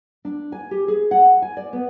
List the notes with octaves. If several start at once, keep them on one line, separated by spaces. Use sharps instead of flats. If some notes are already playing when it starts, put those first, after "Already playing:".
D4
G#5
G4
G#4
F#5
G#5
D5
B3